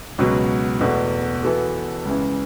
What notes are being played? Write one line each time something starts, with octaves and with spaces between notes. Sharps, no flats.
C#2 B2 F#3
E2 B2 A3
E3 B3 F#4 A4
C#2 C#3 E3